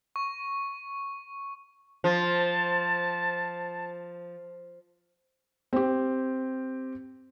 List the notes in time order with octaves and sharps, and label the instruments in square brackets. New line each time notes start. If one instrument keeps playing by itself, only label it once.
[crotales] C#6
[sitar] F3 [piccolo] A5
[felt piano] C4 G4